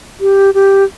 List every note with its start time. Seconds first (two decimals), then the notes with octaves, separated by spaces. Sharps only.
0.21 G4
0.54 G4